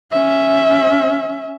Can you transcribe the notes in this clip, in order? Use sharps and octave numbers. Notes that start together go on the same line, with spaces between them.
C#4 E5